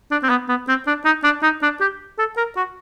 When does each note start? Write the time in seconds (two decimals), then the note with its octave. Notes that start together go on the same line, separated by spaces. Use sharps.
0.11 D4
0.23 C4
0.29 B3
0.49 B3
0.68 C4
0.87 D4
1.05 D#4
1.24 D4
1.43 D#4
1.63 D4
1.81 G4
2.19 A4
2.37 A#4
2.57 F#4